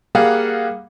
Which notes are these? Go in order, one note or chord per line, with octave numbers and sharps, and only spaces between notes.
G3 A#3 G#4 F5 F#5